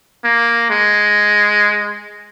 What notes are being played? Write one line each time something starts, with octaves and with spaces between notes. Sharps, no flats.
A#3
G#3